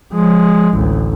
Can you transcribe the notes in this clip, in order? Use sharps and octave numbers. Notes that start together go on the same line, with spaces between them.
F3 G#3
A1 D2